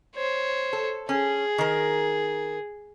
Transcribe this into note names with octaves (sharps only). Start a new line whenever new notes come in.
C5 C#5
A4
C#4 G#4
D#3 A#4